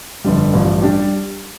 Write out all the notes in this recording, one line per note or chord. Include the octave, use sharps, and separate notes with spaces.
G1 F2 D3 G3
A1 G2 F3
G3 D4 G4